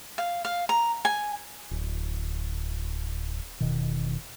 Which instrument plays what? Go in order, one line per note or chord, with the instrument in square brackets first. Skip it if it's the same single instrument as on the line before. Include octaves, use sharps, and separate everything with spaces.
[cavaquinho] F5
F5
A#5
G#5
[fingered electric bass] D1
E1 B2 D#3